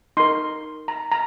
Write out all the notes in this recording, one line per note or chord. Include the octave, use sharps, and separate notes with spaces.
D#4 A#4 C6
A#5
A#5